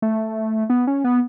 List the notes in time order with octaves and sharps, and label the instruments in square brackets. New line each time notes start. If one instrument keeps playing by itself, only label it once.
[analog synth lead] A3
B3
C#4
B3